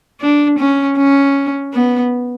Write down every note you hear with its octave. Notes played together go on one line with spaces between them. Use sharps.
D4
C#4
C#4
B3